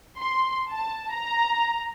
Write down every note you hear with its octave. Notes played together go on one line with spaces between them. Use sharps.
C6
A5
A#5